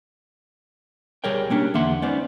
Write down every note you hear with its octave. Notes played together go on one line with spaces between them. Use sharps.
B1 G3 G#4 A#4 C#5 G5
A#3 C#4 D4 G4
E2 D3 A#3 E5 F#5 C6
G#3 B3 C#4 D#4 C5 D5